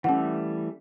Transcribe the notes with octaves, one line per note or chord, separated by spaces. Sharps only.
E3 G3 A3 C#4 F#5